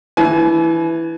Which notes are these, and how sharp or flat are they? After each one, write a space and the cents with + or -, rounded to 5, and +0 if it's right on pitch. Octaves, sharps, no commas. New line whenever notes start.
E3 +0 G#5 +45